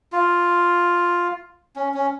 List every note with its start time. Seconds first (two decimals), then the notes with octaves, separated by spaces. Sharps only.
0.12 F4
1.76 C#4
1.94 C#4